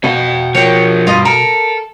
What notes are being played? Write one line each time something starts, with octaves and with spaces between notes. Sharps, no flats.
B2 F5 G5
F3 A#3 C#5 G5
G2 F4 D#5
A4 A#4